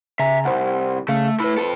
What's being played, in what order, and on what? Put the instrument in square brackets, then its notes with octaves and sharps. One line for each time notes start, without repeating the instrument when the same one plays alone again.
[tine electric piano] C#3 G#5 A#5 [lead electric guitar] E5
[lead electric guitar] C2 [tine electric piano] C5 F#5
[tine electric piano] C#3 F5 [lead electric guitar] A3
[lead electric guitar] A3 E4 [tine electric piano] B4 B5
[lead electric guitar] F2 A4